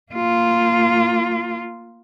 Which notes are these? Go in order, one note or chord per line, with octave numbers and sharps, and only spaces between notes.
A#3 F4